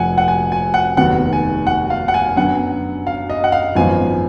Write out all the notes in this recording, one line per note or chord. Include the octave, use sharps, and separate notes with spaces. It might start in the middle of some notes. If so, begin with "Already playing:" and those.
Already playing: F1 F2 F3 F#5 G#5
F#5
G#5
G#5
F#5
F1 D#2 D#3 F#3 B3 F#5
G#5
F#5
F5
F#5
G#5
F#2 D3 F#3 B3 F#5
F5
D#5
F#5
F5
G#1 F#2 F3 B3 G#5